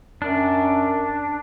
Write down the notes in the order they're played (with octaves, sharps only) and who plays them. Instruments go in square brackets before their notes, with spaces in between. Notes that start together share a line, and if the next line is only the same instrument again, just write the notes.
[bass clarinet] F#2 [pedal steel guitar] D4